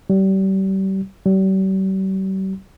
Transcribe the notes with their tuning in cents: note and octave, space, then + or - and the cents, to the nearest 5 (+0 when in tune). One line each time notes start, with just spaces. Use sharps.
G3 -35
G3 -45